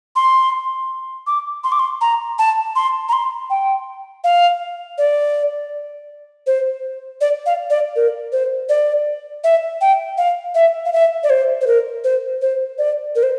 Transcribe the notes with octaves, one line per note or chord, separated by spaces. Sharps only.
C6
D6
C6
D6
C6
A#5
A5
C6
A#5
C6
G5
F5
D5
C5
D5
F5
D5
A#4
C5
D5
E5
G5
F5
E5
F5
E5
D5
C5
C5
A#4
C5
C5
D5
A#4
C5